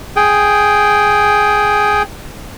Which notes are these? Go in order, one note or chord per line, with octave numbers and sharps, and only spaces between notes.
G#4 G5